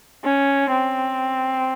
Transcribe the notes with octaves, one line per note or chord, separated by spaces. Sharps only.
C#4
C4